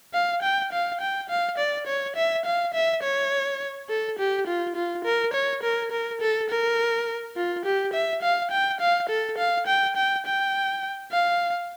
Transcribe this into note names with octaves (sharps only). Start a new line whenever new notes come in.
F5
G5
F5
G5
F5
D5
C#5
E5
F5
E5
C#5
A4
G4
F4
F4
A#4
C#5
A#4
A#4
A4
A#4
F4
G4
E5
F5
G5
F5
A4
F5
G5
G5
G5
F5